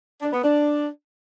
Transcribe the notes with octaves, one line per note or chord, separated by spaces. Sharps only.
D4
B3
D4